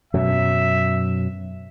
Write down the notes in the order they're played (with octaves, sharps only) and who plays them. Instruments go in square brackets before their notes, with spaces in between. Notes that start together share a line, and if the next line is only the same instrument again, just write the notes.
[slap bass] F#2 B2 F#3 [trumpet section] E5